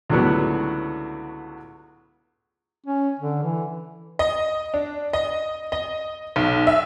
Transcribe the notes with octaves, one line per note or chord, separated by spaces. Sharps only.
C#2 A2 D3 F#3 B3
C#4
D3
E3
D#5
D4
D#5
D#5
B1
E5